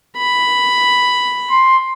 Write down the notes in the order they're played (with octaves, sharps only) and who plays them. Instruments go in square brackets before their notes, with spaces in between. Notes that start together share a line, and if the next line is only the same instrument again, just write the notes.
[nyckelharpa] B5
[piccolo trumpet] C6